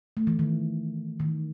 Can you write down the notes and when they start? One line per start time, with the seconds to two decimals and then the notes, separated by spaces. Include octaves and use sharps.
0.17 A3
0.27 E3
0.39 D#3
1.20 D#3